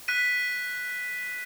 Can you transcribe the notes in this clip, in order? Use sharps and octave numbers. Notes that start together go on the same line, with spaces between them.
F#6 B6 D#7